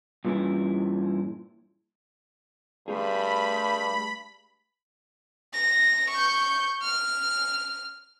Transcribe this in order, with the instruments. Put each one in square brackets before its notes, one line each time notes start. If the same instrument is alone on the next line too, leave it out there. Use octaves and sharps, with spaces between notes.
[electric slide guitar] G2 A#2 E3 G#3 C#4 E4
[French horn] G2 [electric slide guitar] A3 G4 G#4 [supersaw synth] B5
[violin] A#6
C#6 G6
F6